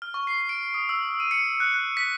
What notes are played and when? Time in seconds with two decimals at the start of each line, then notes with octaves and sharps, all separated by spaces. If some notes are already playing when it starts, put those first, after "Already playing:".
0.02 F6
0.14 C#6
0.27 C7
0.49 D7
0.74 D#6
0.89 E6
1.20 D#7
1.31 C#7
1.60 F#6
1.74 F#6
1.97 B6